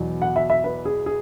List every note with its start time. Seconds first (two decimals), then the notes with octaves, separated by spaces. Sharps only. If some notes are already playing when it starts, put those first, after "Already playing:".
Already playing: E2 B2 F#3
0.22 F#5
0.36 E5
0.50 E5
0.64 B4
0.85 G#4
1.06 G#4